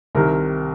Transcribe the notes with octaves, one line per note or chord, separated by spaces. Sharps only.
C2 C3 D#3 A#4